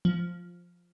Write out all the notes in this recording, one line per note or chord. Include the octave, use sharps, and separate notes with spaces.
F3